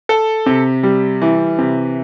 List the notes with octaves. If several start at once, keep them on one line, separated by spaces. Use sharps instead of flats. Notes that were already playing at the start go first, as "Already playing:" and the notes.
A4
C3
G3
E3
C3